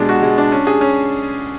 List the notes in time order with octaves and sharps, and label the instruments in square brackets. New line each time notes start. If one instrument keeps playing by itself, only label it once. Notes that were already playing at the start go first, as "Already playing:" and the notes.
Already playing: [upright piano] B2 G#3 D4
F#4
G#3
D4
C#4
G#4
C#4